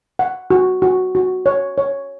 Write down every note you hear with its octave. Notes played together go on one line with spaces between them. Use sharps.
F#5
F#4
F#4
F#4
C#5
C#5